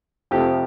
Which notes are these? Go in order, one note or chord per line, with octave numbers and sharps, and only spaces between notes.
F2 C3 F3 A3 G4